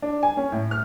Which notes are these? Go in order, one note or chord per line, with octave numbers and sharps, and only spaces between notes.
D4
G#5
C#4
A2
F6